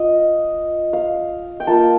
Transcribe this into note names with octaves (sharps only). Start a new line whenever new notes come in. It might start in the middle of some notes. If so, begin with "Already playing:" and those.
Already playing: F4 D#5
F5
G5
A#3 F4 A5